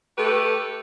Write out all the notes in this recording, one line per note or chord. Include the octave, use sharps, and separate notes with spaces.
A3 G4 A4 B4